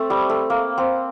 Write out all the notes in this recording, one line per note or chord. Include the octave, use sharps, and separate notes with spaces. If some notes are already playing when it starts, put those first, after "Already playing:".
Already playing: A3 C4
G3
A3
A#3
C4